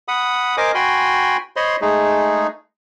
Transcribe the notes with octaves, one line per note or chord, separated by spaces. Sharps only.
F#5 B5 D#6
A#4 C5 D#5 G#5 D6
F#4 G5 G#5 B5 C6
C5 C#5 D#5 B5 C6
G#3 A3 D#4 G#4